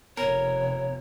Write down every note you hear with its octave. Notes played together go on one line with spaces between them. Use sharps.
F1 B3 A#4 C#5